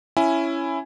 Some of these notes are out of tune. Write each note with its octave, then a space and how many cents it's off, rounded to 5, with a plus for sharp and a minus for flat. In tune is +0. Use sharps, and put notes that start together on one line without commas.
C#4 +0 E4 +10 G#5 +0